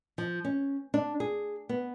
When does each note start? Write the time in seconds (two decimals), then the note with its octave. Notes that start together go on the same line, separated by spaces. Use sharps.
0.18 F3
0.45 C#4
0.94 D4
1.20 G#4
1.69 B3